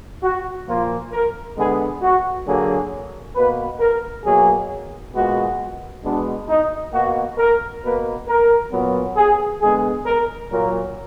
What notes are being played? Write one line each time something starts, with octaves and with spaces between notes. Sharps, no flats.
F#4
A#2 F3 A#3 F4
A#4
D3 G#3 B3 G#4
F#4
D3 F#3 A#3 G#4
B2 A#3 B4
A#4
B2 F#3 A#3 G#4
A#2 G#3 B3 F#4
B2 G#3 B3 D4
D#4
B2 A#3 F#4
A#4
B2 A#3 B4
A#4
A#2 F#3 B3
G#4
D3 G#3 B3 G#4
A#4
A#2 F#3 A#3 A#4